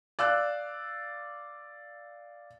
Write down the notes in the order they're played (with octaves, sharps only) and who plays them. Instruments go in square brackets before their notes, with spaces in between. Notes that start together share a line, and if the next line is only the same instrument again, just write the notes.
[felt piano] D5 F5 E6 F#6